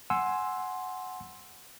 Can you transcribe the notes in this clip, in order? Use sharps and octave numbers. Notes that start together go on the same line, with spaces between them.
F#5 G#5 C6 E6